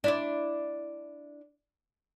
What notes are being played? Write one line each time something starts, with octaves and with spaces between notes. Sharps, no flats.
D4 E4 D5